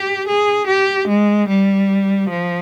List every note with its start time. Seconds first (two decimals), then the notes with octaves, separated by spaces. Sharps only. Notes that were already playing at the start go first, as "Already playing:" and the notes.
Already playing: G4
0.28 G#4
0.68 G4
1.08 G#3
1.49 G3
2.30 F3